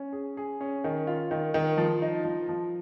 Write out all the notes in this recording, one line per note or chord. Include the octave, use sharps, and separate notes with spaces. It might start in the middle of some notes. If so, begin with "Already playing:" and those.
Already playing: C#4
G#4
G#4
C#4
D#3
F4
D#3
D#3
F3
D#4
F3
F3